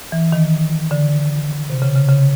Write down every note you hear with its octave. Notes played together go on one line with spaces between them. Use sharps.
E3
D#3
D3
C3
C#3
C#3
C#3